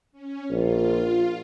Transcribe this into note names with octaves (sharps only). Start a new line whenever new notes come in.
C#4
A#1 F4